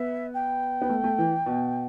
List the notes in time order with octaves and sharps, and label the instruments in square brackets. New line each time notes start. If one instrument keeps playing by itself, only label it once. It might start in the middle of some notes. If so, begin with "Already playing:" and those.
Already playing: [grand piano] B3 [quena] E5
[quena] G5
[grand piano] B3
A3
A3
E3
B2